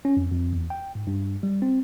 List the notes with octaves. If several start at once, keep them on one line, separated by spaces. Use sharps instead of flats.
C#4
F2
F2
E2
G5
G#2
G2
G3
C4